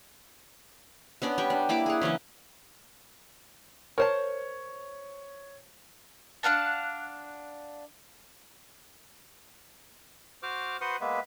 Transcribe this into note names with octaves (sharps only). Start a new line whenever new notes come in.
B3 C#4 D4 D5
G3 G4 G5 C#6
D4
A#3 E4 B5 D6
G#4 F#5
C#3 E3 F#3 C#4
A#4 C5 C#5 A5
D4 F5 F#5 A5
F#4 C5 D6 F6
F#4 B4 C5 F#5 C6 D#6
G#3 A#3 B3 B4 E5